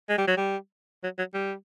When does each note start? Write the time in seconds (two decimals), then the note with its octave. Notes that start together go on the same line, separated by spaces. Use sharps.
0.09 G#3
0.18 G3
0.27 F#3
0.37 G3
1.04 F#3
1.18 F#3
1.34 G3